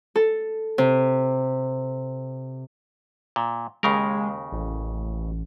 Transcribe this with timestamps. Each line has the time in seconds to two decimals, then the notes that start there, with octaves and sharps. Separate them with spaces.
0.16 A4
0.78 C3
3.36 A#2
3.83 D#2 C#3 G#3 A#4
4.52 A1